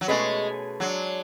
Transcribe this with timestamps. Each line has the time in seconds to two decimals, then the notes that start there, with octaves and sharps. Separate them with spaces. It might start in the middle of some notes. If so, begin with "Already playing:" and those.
0.01 F#3
0.08 B2 G#3 A3 C#4 G#4 B4
0.80 F#3 G#3 D4 G#4